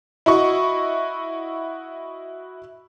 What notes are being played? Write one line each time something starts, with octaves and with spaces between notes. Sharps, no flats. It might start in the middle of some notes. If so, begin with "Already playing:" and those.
E4 F#4 D#5 C#6